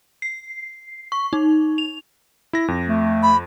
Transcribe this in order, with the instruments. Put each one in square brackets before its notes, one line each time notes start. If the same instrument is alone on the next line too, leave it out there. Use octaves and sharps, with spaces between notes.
[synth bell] C7
C#6
D#4
F7
[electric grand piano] E4 A#6
F2
[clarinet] A3
[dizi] B5